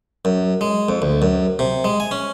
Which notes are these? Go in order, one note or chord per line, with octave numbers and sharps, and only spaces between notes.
F#2
G#3
F2
D2
F#2
C3
G#3
G#5
C#4